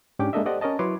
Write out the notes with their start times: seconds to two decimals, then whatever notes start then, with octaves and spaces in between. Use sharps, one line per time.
0.19 G#2 C#4 D4 G4 G5 D6
0.33 G#3 A#3 D4 A4 D#5 E5
0.45 G4 A4 C5 D5 D#5 F#5
0.61 C#4 A#4 C#5 D#5 A5
0.79 F#3 E4 B4 C#5 C6 D6